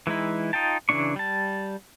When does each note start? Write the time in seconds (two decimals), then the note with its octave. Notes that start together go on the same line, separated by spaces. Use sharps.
0.07 E3 G#3 D#4 E4
0.53 D#4 F4 G5 A5
0.89 C#3 E3 C#4 D4 C#6
1.16 G3 A5